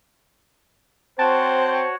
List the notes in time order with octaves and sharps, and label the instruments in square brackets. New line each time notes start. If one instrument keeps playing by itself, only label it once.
[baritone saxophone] C4 [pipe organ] F#4 C#5 F#5 [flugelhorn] C5 [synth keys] A5